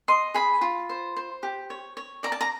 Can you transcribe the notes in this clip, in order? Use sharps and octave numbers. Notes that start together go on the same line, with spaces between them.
D#5 C6
G#4 B5
F4
C5
C5
G4
C#5
C#5
D5 A#5
A5
A#5